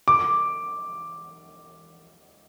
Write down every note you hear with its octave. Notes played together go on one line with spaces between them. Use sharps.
D6